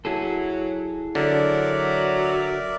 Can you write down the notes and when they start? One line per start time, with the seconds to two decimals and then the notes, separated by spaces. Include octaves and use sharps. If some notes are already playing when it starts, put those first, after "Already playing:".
0.05 F#3 E4 G#4 A4
1.15 D3 F#3 A#4 D5 E5